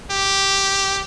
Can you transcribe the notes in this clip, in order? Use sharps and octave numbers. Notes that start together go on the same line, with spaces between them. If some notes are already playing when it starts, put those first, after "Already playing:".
G4